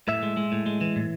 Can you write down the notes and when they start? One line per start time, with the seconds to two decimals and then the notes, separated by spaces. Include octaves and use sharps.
0.08 A2 E5
0.23 G#3
0.37 G#3
0.52 A2
0.66 G#3
0.81 E3
0.96 A2